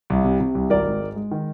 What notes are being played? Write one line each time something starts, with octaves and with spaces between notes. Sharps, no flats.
C2
C3
C3
C2
G#1 A#4 D5
G#2
G#3
G#3
D#3